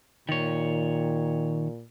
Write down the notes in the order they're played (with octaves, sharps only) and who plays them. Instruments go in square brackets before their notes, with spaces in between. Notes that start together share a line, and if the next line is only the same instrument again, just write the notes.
[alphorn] A#2 [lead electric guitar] D#3 C#5